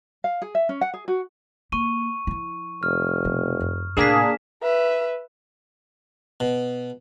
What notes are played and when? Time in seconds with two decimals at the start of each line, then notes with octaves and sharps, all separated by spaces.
0.24 F5
0.42 G#4
0.55 E5
0.69 C#4
0.81 F#5
0.94 G#4
1.08 F#4
1.72 A#3 C#6 D#7
2.27 F3 E4
2.83 F1 F6
3.24 B2 F3
3.60 F#2
3.97 A2 C3 A#3 D4 G#4 B6 E7
4.62 B4 E5
6.40 B2